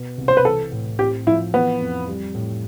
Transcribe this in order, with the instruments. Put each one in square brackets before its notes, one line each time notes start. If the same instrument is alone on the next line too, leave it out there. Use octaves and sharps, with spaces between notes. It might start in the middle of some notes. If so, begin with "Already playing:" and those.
Already playing: [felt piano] B2
C2
[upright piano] C5
B4
[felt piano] E3 [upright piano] A4
[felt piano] A2
[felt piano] C4 [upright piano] G4
[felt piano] F3 [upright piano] E4
[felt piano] E3 [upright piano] B3
[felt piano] F2
G3
A2